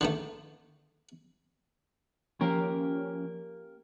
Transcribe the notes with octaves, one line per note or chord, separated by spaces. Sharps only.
D3 D#3 A3
F3 A#3 C#4 G4 A#4